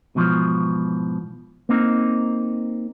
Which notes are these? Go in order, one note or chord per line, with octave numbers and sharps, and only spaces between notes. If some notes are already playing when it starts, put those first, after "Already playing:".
G#2 B2 E3 F3
A#3 C4 D#4